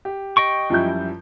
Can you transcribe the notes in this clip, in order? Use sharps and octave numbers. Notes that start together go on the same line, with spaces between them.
G4
D#5 G5 C#6
F#2 F3 G3 E4 G6